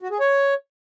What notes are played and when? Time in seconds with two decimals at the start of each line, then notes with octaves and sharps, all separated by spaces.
0.02 F#4
0.11 G#4
0.20 C#5